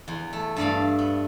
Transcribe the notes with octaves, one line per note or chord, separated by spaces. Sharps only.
E2
A3
G2 A3 D5 F5
B3